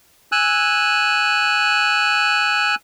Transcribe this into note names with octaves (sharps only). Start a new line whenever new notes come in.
G#5 E6 F#6